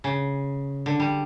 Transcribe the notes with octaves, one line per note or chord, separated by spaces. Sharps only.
C#3
D3
G3